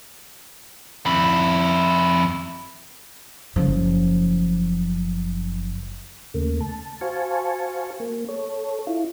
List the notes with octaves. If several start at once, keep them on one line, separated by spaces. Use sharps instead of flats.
F2 E4
F#1 F3
D#2 C#3 A3 A#3
A5
F#4 C5 F5 G#5 A5 C#6
A#3
A4 C#5
E4 F4